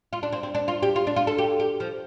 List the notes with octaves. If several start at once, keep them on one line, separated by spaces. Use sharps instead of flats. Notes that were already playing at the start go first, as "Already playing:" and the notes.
F4
D4
C4
C4
D4
F4
G4
F4
D4
F4
A4
G4
G4
F3